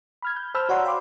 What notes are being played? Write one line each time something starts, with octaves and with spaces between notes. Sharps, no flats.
B5 F6 G#6
G6
C5 A5 B5 E6 F6 G6
F#4 C#5 D5 F#5 A#5 C6
F5 G5 B5 C6 D6